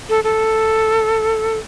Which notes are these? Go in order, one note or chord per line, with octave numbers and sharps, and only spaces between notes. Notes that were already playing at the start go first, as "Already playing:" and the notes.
A4
A4